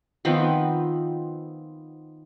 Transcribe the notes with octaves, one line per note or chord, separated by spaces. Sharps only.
D#3 F3 B3 C4